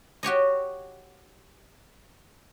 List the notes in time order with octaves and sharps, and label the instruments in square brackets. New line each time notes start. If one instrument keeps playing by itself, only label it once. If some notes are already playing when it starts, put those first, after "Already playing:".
[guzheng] F#4 G4 C#5 D#5